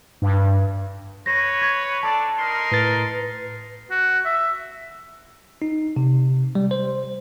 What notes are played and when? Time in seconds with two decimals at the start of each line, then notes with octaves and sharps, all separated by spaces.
0.22 G2
1.26 B4 C#5 A#6
1.61 C#6 G#6
2.03 D4 A4 D5 A5
2.37 D#4 A#4 C6
2.72 A2 B4 A6
3.91 F#4
4.26 E5
5.62 D#4
5.96 C3
6.55 G3
6.71 C5